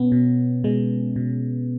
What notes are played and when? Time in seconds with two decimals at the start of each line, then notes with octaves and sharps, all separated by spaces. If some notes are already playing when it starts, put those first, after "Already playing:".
Already playing: B2 B3 C#4
0.12 B2
0.64 B2 G#3
1.16 B2